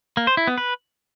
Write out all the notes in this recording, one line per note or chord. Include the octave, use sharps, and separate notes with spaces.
A#3
C5
E4
B3
B4